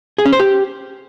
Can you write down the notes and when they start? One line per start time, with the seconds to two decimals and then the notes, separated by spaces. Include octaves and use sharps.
0.18 G#4
0.25 C#4
0.33 C5
0.40 G4